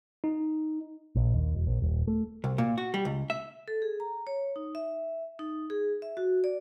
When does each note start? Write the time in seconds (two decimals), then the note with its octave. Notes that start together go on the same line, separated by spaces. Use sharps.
0.24 D#4
1.15 A#1
1.33 D#2
1.55 E1
1.67 A#1
1.82 D#1
2.07 A3
2.44 C2
2.58 A#2
2.78 F#4
2.94 G3
3.05 C#2
3.30 E5
3.68 A4
3.82 G#4
4.00 A#5
4.27 C#5
4.56 D#4
4.75 E5
5.39 D#4
5.70 G#4
6.02 E5
6.17 F#4
6.44 D5